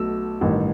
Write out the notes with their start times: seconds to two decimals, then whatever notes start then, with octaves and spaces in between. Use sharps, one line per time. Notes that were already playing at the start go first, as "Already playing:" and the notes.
Already playing: B1 B2 A3 E6
0.41 A1 G2 D#3